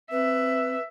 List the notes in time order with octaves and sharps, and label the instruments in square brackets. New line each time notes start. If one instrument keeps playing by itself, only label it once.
[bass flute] C4 [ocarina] B4 [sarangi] E5